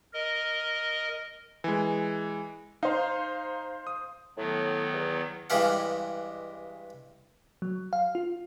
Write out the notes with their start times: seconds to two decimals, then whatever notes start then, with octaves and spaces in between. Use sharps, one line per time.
0.14 A#4 D#5
1.64 E3 G#3
2.83 D#4 C5 F5
3.87 D#6
4.37 A2 D#3 F#3 B3
4.93 E2
5.50 G2 E3 G#3 G4 F5 F#5
7.62 F#3
7.93 F5
8.15 F4